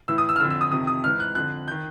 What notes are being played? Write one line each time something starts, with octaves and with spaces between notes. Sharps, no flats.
A2 E3 E6
D#6
E6
F6
F2 D3 E6
E6
D#6
F2 C3 D#3 D#6
D#6
G#2 E3 F6
F#6
F2 D3 F#6
D#3 G6